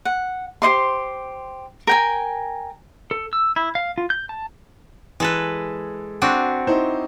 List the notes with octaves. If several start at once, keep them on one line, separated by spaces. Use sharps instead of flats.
F#5
G4 C5 D#5 C6
A#4 G5 G#5
A4
E6
E4
F5
F4
G6
A5
E3 G#3 A4 B4
C4 D4 F#4
D#4 E4 C5